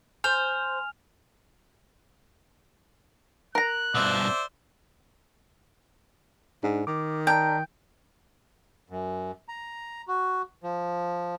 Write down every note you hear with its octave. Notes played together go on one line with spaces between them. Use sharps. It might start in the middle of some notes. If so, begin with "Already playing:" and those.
C5 G#5 F6 F7
A#4 A#5 F#6
G2 B2 C5 D5 E5
G#2 D4
D#3 D6
D5 G5 A5 A#5
F#2
A#5
F#4
F3